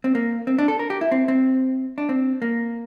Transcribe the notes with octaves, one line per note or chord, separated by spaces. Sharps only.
C4
A#3
C4
D4
A4
A#4
G4
E4
C4
C4
D4
C4
A#3